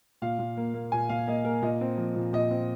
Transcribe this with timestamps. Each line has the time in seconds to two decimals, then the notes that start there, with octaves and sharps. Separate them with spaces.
0.22 A#2 F5
0.39 A#2
0.57 A#3
0.74 A#3
0.92 A#2 G#5
1.09 A#2 F5
1.27 A#3 D#5
1.45 A#3 A#4
1.62 A#2 D#5
1.81 C4
1.97 F3
2.16 A#2
2.33 A#2 D#5
2.51 C4